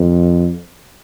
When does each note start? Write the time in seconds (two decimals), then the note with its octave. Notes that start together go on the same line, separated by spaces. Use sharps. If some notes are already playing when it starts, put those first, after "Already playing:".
Already playing: F2